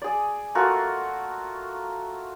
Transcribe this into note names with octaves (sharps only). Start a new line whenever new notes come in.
G#4 D5
A3 A#3 F4 F#4